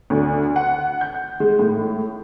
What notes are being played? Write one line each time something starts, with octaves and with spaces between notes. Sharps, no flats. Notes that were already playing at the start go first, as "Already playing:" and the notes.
D2
F#5
G6
G#3
A2